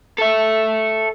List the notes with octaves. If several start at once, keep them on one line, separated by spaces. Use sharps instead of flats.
A4 E5